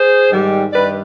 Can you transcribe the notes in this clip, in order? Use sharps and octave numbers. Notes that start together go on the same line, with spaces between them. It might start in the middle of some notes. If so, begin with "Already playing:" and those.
Already playing: G#4 C5
G#2 D#3 G3
G2 D#3 G3 B4 D5